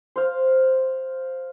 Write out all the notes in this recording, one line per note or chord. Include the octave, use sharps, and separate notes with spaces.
C5 F5